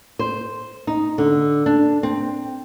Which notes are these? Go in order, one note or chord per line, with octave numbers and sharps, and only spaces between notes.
C5
D#4
D3
D4
C4